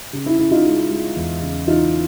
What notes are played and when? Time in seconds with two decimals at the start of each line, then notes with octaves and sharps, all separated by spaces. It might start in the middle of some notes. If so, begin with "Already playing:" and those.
0.13 C#3
0.26 E4
0.39 C#3 E4
0.51 D#4 F4
0.65 G#3
0.90 G#3
1.16 E2
1.42 C#3
1.67 E3 D#4 F4